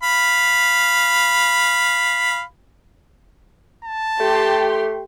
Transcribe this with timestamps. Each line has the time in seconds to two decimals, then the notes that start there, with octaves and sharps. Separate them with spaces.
0.03 F5 B5
3.85 A5
4.20 A3 G4 C6